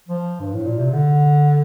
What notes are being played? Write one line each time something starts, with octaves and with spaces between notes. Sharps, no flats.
F3
G2
A2
A#2
C3
D3